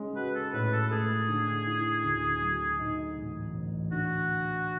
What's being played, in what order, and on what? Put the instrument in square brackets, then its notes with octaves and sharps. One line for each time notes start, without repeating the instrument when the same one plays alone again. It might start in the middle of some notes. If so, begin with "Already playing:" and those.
Already playing: [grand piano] G#3 C#4
[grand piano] F#4 [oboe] B4
[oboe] A4
[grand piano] A2 [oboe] B4
[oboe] A4
[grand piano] A3 [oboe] G#4
[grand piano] D3
E4
D2
F#3
G#2
A1
A1
[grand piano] D3 [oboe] F#4